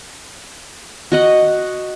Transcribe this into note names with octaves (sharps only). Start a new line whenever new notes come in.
F#4 D#5 F#5